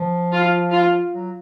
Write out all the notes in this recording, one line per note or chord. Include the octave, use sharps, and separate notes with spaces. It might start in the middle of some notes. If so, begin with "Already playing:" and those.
Already playing: F3
F4
F4
F#3